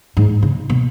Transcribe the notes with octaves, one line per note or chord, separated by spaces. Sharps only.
G#2
C#3
B2